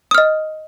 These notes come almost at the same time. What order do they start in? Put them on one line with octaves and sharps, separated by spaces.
D#6 F6 D#5